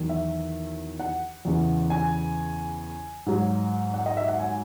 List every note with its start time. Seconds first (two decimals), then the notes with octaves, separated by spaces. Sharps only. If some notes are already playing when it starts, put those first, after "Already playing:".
Already playing: E2 D#3 F#3
0.09 E5
1.00 F#5
1.45 E2 C#3 E3
1.90 G#5
3.26 G#2 F#3
3.94 F#5
4.06 D#5
4.17 E5
4.28 F#5
4.39 G#5